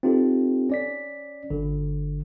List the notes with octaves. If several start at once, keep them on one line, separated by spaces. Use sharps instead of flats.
C4 D#4 F4 G4 A4
C#4 D5 B6
G1 D3